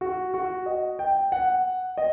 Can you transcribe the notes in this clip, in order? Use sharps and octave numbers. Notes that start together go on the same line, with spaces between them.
F#4
F#4
D#5
G5
F#5
D#5